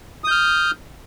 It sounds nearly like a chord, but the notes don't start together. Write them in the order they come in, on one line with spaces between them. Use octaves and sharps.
D#6 G6 F6